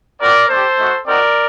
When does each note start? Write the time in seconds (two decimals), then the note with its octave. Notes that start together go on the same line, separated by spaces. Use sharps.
0.21 C4 F#4 A#4 D5
0.49 A3 D4 G4 A4 C5
0.78 A3 D#4 F#4
1.06 C4 D#4 F#4 A#4 D5